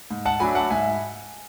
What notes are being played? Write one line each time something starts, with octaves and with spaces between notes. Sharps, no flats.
G#2
F#5 A5
F#3 A3 D4 G#5 B5
F#5 A5
G#2 E5 G#5